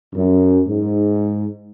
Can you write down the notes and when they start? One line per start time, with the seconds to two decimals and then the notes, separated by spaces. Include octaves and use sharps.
0.15 F#2
0.69 G#2